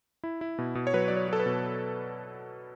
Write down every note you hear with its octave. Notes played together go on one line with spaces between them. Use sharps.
E4
E4
B2
B2
C#5
F#3 B4
F#3 D5
C#5
F#3 A4
B4
B2